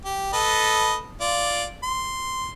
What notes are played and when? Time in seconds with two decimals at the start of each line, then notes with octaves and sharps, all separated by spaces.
0.05 G4
0.33 A4 B4 D#5
1.21 F4 D5
1.84 C6